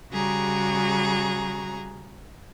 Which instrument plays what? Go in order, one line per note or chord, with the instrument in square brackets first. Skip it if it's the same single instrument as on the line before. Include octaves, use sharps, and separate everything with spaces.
[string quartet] C#3 G3 F#4 G#4 A#5